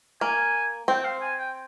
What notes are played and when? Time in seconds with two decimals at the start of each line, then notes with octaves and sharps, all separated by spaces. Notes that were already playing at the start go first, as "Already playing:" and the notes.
0.21 A#3 G#5
0.88 C4 G5
1.00 G5
1.04 F5
1.21 G#5
1.39 G5